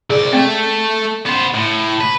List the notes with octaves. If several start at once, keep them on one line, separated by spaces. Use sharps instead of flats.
C2 G#4 D5
A3 C4 A4
B3 C5
A2
B4